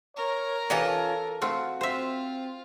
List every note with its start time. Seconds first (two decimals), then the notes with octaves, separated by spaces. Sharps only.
0.17 A#4 C#5
0.70 E3 C#4 D#4 F4 G4 A4 A5
1.42 A3 C4 F4 F#4
1.81 C4 F4 C5 E5